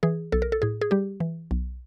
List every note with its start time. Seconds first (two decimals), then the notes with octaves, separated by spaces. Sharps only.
0.03 E3 G#4
0.32 B1 A4
0.42 A#4
0.52 A4
0.62 A2 G#4
0.81 G#4
0.91 G3 G4
1.20 E3
1.51 B1